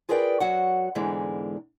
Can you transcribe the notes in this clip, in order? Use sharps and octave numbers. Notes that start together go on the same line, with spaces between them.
F4 G#4 A#4 B4 D5 G5
F#2 F#3 F#4 F#5
E2 G#2 D3 E3 G#3